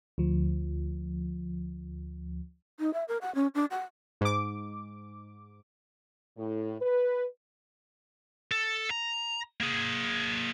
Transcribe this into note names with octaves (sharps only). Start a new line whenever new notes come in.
D2 F3
D#4
E5
A#4
F#5
C#4
D4
F#5
G#2 D6
A2
B4
A4
A#5
A#3 G#4